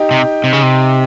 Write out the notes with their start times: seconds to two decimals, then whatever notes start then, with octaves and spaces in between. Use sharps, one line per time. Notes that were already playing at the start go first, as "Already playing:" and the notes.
Already playing: D#4 G4
0.11 C3
0.44 C3
0.53 C#3
0.62 C3